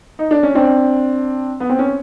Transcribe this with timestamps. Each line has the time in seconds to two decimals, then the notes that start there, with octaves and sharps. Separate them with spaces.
0.19 D#4
0.31 D4
0.43 C#4
0.55 C4 D4
1.60 B3
1.70 C4
1.79 C#4